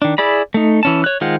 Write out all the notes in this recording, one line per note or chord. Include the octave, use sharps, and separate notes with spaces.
D#3 D4
E4 G#4 D5 B5
A3 D#4
E3 C#4 A5
C#5 F#6
D#3 G#3 F4 C5 F#5